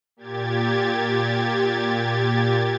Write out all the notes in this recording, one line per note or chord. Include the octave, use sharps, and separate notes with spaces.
A#2 G4 G#6 A6